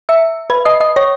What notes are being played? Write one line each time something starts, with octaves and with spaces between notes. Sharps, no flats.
E5 E6
B4 B5
D#5 D#6
D#5 D#6
C#5 C#6